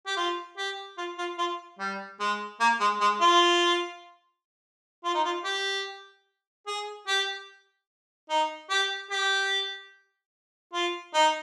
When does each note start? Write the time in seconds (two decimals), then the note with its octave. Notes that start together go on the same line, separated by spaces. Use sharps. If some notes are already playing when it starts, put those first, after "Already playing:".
0.07 G4
0.17 F4
0.57 G4
0.97 F4
1.18 F4
1.38 F4
1.79 G3
2.20 G#3
2.60 A#3
2.80 G#3
3.01 G#3
3.21 F4
5.04 F4
5.14 D#4
5.24 F4
5.45 G4
6.67 G#4
7.08 G4
8.29 D#4
8.70 G4
9.11 G4
10.74 F4
11.14 D#4